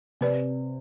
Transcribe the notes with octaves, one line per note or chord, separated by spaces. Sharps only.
C3 C4 G4 B4 D5